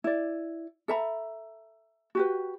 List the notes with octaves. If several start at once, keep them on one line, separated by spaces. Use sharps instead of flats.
E4 D5
A4 E5 A#5 B5
F#4 G4 B4